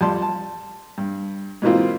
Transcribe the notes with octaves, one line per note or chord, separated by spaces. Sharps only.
F2 G3 A5 C6
A5
G2
G#2 B2 E3 A#3 C4 F4